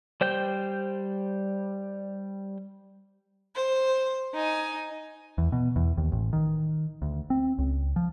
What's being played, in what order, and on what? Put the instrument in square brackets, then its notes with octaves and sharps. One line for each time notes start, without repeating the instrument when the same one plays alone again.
[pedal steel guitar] G3 C5 G5 G6
[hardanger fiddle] C5
D#4 G#5
[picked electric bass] E2
B2
E2
D#2
A1
D#3
D2
C4
C#2
F3